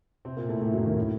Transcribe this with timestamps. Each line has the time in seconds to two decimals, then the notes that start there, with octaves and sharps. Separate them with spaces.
0.25 C3 C4
0.37 A#2 A#3
0.49 A2 A3
0.61 A2 A3
0.73 F#2 F#3
0.85 D#2 D#3
0.97 A2